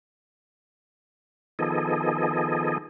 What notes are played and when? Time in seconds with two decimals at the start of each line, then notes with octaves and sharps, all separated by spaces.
1.59 D#3 F3 B3 G#4 A4 D#5